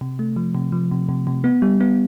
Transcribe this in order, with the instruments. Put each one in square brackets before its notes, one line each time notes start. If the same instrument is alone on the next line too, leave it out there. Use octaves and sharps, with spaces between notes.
[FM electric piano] C3
A3
F3
C3
F3
C3
C3
C3
B3
G3
B3